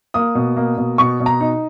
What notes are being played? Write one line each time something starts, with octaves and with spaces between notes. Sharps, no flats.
A#3 D#6
B2
A#3
B2
B2 C#6
B2
A#5
D#4